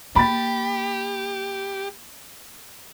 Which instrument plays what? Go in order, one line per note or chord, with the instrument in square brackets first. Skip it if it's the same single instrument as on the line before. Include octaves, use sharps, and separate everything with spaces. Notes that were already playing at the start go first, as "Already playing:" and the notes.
[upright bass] A#3 [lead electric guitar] G4 [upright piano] B5 A6